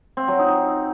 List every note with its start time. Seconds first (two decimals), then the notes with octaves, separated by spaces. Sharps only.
0.17 C4
0.28 F#3
0.39 D#4